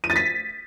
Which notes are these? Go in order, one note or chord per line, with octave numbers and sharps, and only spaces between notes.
D#7
A6
B6